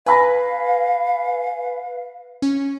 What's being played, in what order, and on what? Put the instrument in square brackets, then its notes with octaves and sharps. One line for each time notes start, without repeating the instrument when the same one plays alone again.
[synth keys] B4 [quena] F5 [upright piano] G#5 B5 A#6
[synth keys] C#4